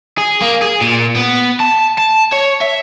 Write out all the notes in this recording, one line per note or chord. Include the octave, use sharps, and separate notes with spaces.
G#4
A#3
G#4
A#2
B3
A5
A5
C#5
E5